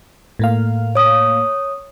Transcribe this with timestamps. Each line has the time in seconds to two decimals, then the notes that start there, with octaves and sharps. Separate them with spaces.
0.39 A2 A#3 F5
0.95 C#5 D#6